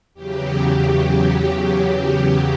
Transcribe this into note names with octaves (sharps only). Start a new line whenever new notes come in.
E2 C#3 F#3 G4